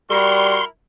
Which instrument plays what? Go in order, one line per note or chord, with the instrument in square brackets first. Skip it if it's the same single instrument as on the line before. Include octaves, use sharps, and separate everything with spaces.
[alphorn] G3 [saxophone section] E4 F#4 A#4 [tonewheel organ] C6